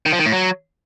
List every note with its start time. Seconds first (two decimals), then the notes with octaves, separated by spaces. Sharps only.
0.06 D#3
0.12 F3
0.19 D#3
0.26 A2
0.32 F#3